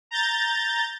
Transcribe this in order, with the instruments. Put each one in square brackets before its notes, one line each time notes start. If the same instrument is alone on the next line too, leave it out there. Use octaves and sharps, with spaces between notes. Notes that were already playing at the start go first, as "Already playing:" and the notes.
[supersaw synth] A#5 G6 A6